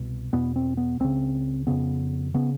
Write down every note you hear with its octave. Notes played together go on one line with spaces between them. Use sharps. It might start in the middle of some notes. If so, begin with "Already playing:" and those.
Already playing: C2 B2
E2 B2 B3
C4
B3
C#2 C#3 C4
F2 C#3 B3
C#3 B3